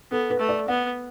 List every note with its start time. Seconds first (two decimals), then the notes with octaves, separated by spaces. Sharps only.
0.11 B3 A4
0.30 B4
0.39 A3
0.49 D5
0.68 B3 F#5